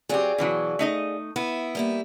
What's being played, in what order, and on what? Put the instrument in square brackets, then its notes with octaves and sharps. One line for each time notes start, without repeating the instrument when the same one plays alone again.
[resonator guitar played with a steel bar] F#3 C4 G4 [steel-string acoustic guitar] G#4 D5 F5
[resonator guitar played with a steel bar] B2 E3 F#3
A3 D#4 D#5
[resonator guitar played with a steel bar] B3 [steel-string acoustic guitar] E4
[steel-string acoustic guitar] G3 A#3 E4